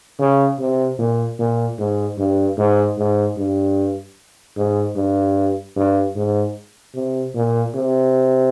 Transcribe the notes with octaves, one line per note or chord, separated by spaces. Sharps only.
C#3
C3
A#2
A#2
G#2
G2
G#2
G#2
G2
G#2
G2
G2
G#2
C3
A#2
C3